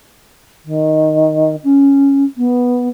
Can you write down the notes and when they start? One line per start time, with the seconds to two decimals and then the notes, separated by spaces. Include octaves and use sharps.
0.65 D#3
1.64 C#4
2.37 B3